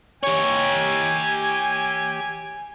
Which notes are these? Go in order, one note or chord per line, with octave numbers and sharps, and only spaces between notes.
G4 C#5 G#5